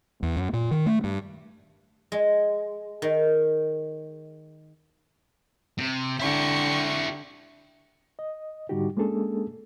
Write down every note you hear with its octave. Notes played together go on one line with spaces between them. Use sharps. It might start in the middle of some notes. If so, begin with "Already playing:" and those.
E2
F#2
A#2
D#3
A3
G2
G#3
D#3
C3
D3 E4 G4 C#6 G6
D#5
G#2 D3 G3 D#4 F#4 G4
G#3 A#3 C#4 D4 G#4 A4